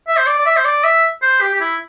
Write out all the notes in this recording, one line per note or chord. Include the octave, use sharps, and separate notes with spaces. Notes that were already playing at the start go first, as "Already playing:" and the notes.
E5
C5
D5
D5
E5
C5
D5
E5
C5
G4
G4
E4